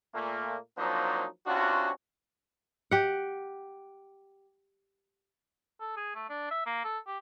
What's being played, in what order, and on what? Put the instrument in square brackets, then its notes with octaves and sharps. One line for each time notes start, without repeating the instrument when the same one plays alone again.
[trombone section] A#2 A3 A#3
F3 F#3 A#3 C4 D4 D#4
C3 C#4 D4 F4 F#4
[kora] G4 F#5
[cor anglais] A4
G#4
A3
D4
E5
A#3
A4
G4